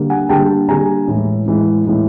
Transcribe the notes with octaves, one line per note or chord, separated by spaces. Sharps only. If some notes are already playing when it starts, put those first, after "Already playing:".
Already playing: D3 G3 A#3
F#5 G#5
D3 G3 A#3 G5 A5
D3 G3 A#3 G#5 A#5
A2 E3 G#3
A2 E3 G#3
A2 E3 G#3